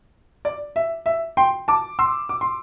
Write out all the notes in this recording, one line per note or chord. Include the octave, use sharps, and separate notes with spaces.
D5
E5
E5
G5 C6
A5 D6
C6 E6
D6
C6